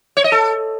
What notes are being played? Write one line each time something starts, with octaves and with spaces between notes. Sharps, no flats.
C#5
D#5
A4